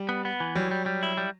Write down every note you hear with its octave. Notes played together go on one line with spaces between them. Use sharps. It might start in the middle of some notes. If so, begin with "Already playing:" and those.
Already playing: G3
B3
B3
E3
F#3 G3
G3
G3
E4
G3